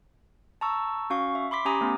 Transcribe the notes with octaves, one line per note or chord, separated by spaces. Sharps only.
A5 A#5 C#6 E6
C#4 F#4 F5 C#6
E5
B5 C6 D6 B6
C#4 G4 G#5 A#5 D6 D#6
A3 B3 C#4